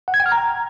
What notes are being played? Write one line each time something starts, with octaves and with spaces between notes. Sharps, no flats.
F#5
G#6
G5
F6
A#5